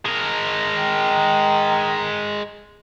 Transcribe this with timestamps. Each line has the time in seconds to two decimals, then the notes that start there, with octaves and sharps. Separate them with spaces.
0.05 G#3 A#4
0.75 D#3